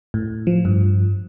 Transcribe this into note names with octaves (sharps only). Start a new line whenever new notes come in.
A2
F3
G2